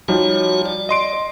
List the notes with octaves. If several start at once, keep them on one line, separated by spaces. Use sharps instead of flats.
F3 G3 D#4 F#4 C#5
D5
D#5 C6 D7